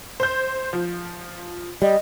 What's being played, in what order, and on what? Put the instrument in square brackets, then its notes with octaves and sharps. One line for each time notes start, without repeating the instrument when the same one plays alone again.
[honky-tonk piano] C5 G6
F3
[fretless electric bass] G3 [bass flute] D#5